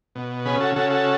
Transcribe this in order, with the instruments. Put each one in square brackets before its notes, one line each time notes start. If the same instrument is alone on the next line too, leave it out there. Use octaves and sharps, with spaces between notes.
[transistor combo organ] B2
C#3 G#4 B4
F#4 A4
C#3 F#4 A4
F#4 A4